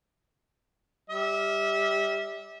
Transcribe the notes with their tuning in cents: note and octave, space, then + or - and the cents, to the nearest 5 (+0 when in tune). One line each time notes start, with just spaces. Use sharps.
G3 +10 E5 -25